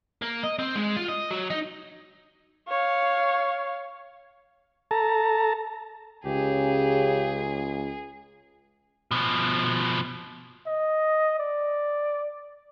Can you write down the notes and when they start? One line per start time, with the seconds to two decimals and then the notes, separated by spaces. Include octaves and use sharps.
0.22 A#3
0.44 D#5
0.59 C4
0.76 G#3
0.96 F4
1.08 D#5
1.31 F#3
1.50 D#4
2.69 C#5 F5
4.91 A4 A5 A#5
6.25 C#2 C#3 G4 G#4
9.11 B2 F3
10.67 D#5
11.39 D5